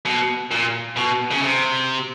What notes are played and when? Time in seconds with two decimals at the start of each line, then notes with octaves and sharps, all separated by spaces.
0.06 B2
0.51 A#2
0.96 B2
1.31 C#3
1.42 C3